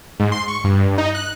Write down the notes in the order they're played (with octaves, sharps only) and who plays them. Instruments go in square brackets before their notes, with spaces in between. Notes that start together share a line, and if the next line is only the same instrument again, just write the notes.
[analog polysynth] G#2
C6
C#6
G2
D#4
F#6